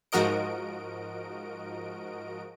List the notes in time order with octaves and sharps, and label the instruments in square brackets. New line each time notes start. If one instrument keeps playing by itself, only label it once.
[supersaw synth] G#2 F3 F#4 A#4 D#5 D7